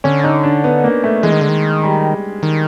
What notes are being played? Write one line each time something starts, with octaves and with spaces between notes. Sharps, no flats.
D3 C#4
D#4
D4
B3
A#3
A3
E3 G#3
D#3
D3
D#3
G3
D#3